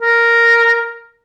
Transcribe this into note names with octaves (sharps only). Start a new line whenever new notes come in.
A#4